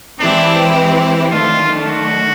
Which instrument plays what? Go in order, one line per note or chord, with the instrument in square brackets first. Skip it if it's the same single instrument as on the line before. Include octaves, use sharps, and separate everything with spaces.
[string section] E3 G#3 C4 E4 G4 [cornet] D4
[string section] D#3 F#3 A3 D4 [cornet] F4
[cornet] F#4